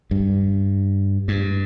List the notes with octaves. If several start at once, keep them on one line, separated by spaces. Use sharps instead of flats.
G2
G2